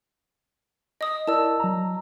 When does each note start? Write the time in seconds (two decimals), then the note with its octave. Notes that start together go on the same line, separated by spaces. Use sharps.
1.01 D#5 D#6
1.27 E4 A#4 D5 A5 E6
1.60 F#3 A#5